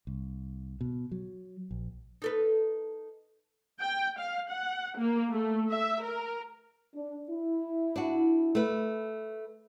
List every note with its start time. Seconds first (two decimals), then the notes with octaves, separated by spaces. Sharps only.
0.07 C2
0.81 B2
1.12 F#3
1.71 A#1
2.22 D#4 A4 B4
3.81 G5
4.19 F5
4.50 F#5
4.98 A#3
5.32 A3
5.69 E5
6.03 A#4
6.95 D4
7.30 E4
7.96 D4 F#4
8.55 A3 B4